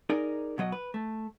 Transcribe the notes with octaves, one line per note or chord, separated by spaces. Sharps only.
D#4 G#4 A#4 D5
B2 F#3 C5 D#5
B4
A3